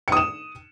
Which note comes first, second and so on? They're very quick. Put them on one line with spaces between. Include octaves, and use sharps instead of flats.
C#7 D#6 E7